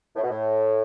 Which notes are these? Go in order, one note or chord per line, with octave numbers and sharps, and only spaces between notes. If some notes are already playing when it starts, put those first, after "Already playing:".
A2
B2
A2